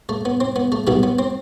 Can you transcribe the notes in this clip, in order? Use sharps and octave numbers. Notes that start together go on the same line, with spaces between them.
A3
B3
C4
B3
A3
B1 B2 G3 B3
B3
C4